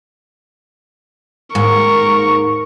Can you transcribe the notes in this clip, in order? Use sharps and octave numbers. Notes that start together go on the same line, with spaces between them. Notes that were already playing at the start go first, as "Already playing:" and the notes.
D#2 G#2 A#4 C#6